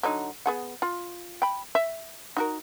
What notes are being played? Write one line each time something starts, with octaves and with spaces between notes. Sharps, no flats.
D3 F#3 D#4
B3 G#4 F#5
F4
G5 B5
E5
D#4 F#4 A#4